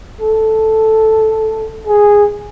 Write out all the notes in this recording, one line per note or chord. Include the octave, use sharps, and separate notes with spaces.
A4
G#4